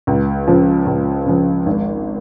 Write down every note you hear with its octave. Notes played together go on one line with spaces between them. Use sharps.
C#2
C#3 F3
C#2
C#3 F3
G#1